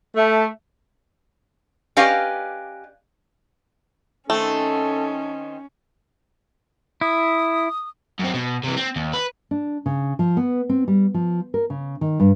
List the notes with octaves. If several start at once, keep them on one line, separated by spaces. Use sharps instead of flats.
A3
C#4 G4 B4 D5 D#5 F5
D#3 A3 C4 C#4 A4
E4 D#6
F#2 C4
B2
C3 E3
C4
D#2
B4
D4
C#3
F3
B3
C4
G3
F3
A#4
C#3
D#3
G2